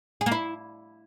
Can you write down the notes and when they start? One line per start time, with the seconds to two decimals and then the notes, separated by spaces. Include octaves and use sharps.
0.21 G#4
0.26 A#3
0.32 E4